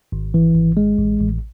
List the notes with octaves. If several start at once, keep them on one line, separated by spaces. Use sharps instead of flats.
G#1
E3
G#1
G#3
A1
A1